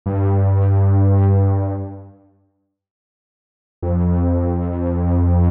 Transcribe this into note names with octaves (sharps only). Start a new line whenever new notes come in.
G2
F2